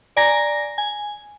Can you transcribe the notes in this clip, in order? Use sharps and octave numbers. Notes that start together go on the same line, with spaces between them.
D5 G#5 A#5 A#6
G#5